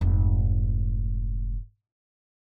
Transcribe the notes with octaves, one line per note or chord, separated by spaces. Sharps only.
F1 G#2